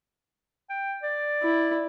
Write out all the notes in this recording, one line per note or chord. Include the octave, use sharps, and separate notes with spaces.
G5
D5
E4